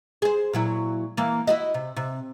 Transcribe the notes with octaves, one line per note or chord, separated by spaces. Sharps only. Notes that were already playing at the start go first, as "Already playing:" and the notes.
G#4 C5
A#2 F#3 E4
E3 A#3
E4 F#4 D#5
C3
C3